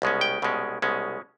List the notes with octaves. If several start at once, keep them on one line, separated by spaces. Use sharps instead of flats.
C2 B2 G#3 C#4
G5
C2 B2 G#3 C#4
C2 B2 G#3 C#4